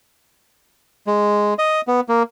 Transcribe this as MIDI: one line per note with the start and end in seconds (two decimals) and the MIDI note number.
1.07 1.54 56
1.59 1.81 75
1.87 2.00 59
2.09 2.23 58